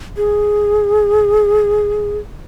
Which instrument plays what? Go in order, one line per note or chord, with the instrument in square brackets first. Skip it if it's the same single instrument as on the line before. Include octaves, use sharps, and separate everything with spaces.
[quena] G#4